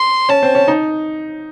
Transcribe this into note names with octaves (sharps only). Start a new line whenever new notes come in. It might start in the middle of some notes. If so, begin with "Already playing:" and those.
Already playing: C6
C#4 A5
C4
C#4
D#4